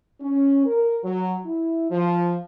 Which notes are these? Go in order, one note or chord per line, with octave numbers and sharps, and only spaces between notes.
C#4
A#4
F#3
E4
F3